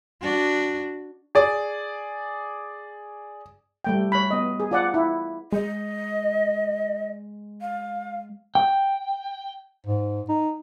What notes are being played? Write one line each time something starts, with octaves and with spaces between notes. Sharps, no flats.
D4 F#4
G#4 D5
G3 A3 G5
C#5 B5
B3 D#5
G#4
F4 D5 F#5
E4
G#3 D#5
F5
G5
G#2
D#4